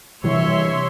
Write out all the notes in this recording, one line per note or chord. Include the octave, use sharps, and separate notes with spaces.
C3 E3 G3 C#5 E5 C6